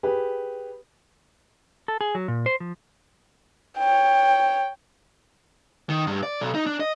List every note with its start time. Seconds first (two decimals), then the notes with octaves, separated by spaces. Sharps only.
0.03 G4 G#4 B4
1.88 A4
2.01 G#4
2.15 F#3
2.28 A#2
2.46 C5
2.60 F3
3.79 C#5 G5
5.89 D#3
6.07 G2
6.23 D5
6.40 B1
6.55 D#4
6.66 D4
6.80 D#5